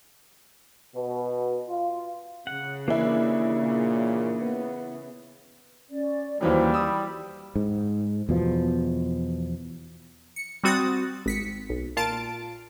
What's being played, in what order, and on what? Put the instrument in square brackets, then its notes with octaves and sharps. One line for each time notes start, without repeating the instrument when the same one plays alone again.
[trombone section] B2
F4
[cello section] C#3 [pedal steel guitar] F#5
[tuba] D#2 [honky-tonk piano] E3 E4 [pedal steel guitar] A#3 D4
[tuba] A#2
B3
[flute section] C#4 D5
[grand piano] D#2 E3 F#3 [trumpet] G3 [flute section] C5
[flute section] B5 [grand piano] D#6 E6
[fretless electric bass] G#2
E2 B2 F3
[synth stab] C#7
G3 C4 F#4 D#6 A6
G#1 B6 C#7
B1
A#2 F4 A5 D7